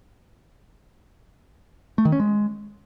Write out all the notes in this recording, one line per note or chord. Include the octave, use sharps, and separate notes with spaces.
A3
D#3
C#4
G#3